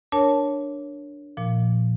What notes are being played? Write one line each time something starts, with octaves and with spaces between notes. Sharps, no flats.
D4 A#4 C#5 A5
A#2 F3